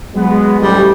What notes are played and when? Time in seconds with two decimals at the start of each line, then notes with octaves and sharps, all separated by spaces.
0.15 F#3 G#3 B3
0.60 A1 D2 G3